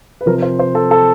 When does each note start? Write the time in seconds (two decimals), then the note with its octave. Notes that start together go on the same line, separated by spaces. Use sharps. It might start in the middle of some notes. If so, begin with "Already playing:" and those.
0.21 B4
0.26 C3 F3 A#4
0.43 C5
0.59 C5
0.75 A4
0.91 A4